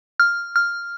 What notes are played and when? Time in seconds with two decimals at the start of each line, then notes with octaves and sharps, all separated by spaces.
0.20 F6
0.56 F6